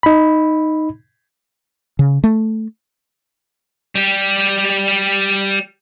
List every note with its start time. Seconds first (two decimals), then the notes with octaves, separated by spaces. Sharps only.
0.03 D#4 B5
1.99 C#3
2.24 A3
3.95 G3 G4